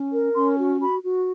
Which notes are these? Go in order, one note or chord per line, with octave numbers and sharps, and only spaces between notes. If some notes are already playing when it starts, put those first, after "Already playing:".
Already playing: C#4
A#4
C#4 C6
F#4
F#4 B5
F#4